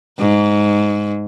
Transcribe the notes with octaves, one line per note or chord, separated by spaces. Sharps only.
G#2